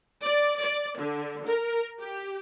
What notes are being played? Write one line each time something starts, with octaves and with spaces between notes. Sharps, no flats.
D5
D5
D3
A#4
G4